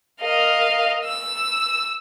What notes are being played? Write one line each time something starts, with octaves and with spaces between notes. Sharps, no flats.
A#4 D#5 F5
E6